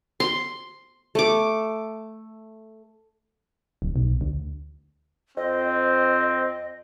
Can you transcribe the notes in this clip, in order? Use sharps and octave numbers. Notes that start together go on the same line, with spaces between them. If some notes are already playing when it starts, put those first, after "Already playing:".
C6
A3 D6
D1
B1
D2
F2 C4 D#5